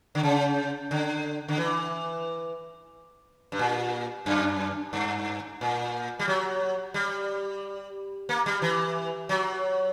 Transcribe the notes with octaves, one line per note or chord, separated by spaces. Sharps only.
D3
C#3
D3
D3
E3
G2
A#2
F#2
G2
A#2
G3
F#3
G3
A#3
G3
E3
F#3